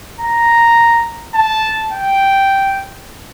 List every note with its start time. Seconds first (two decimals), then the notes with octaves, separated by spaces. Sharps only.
0.20 A#5
1.35 A5
1.92 G5